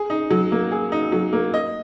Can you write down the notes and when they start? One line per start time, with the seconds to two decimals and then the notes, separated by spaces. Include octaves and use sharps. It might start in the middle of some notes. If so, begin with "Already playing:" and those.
Already playing: G#4
0.10 D#4
0.31 F#3
0.52 A#3
0.72 G#4
0.92 D#4
1.12 F#3
1.33 A#3
1.54 D#5